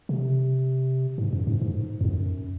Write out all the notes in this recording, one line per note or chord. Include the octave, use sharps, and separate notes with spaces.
C3
G#2
F#2
G#2
G#2
E2
F#2